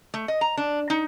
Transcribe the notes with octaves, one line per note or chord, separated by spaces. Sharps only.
A3
D#5
A#5
D4
D#4